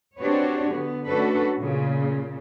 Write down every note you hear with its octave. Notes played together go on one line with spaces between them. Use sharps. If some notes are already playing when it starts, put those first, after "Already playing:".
C4 D4 F#4 G4 B4 C#5
D3 B3
A3 C#4 D4 F#4 A4 B4
A#2 C#3